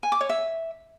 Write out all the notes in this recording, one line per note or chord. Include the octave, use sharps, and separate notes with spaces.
G#5
D6
C#5
E5